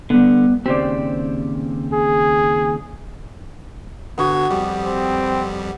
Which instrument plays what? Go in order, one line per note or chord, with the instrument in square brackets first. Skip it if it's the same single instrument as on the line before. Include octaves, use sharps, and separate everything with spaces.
[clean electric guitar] D3 [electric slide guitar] G3 B3
[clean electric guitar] D#2 C#3 C4 [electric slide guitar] G4 C5 D5
[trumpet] G#4
[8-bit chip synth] G1 D3 G#6 [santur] B3 F#4
[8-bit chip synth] F2 G3 [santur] G4
[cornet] C4